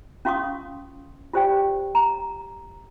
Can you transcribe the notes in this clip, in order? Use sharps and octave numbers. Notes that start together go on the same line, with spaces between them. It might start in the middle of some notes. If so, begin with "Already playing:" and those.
C#4 F4 F5 C6 C#6 D#6
F4 G4 C5 D5 G5
A#5